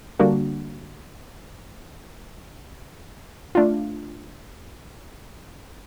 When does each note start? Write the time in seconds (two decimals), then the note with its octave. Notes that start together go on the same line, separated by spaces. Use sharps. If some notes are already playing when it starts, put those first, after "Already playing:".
0.19 D3 G3 A#3 D4 F#4
3.55 A3 D4 F4